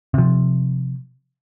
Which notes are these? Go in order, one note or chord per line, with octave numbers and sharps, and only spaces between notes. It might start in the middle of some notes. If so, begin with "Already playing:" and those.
C3 F3